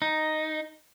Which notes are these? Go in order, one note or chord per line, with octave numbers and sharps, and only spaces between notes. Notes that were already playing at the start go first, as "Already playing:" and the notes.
D#4